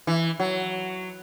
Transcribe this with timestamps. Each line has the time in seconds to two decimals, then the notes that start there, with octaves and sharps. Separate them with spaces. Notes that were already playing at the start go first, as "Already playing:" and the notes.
0.07 E3
0.40 F#3